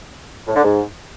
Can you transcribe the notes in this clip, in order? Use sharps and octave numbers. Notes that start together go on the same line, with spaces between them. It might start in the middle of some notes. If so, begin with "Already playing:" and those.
A2
D3
G#2